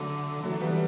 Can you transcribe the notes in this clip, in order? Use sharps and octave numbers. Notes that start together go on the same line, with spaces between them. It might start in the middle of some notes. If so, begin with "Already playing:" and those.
Already playing: D3 F#3 A3
E3 F#3 A3
G3 B3